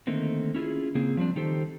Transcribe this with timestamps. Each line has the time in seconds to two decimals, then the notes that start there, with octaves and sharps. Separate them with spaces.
0.07 D3 D#3 A3 A#3 C4
0.55 C#4 E4 F4 G#4
0.95 C#3 A#3 C4 G#4
1.17 F3 G3 C4 D4
1.36 D#3 D#4 G4 A4 C5